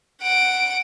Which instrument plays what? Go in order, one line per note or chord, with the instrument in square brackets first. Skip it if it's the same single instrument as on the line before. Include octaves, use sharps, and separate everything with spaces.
[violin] F#5 D7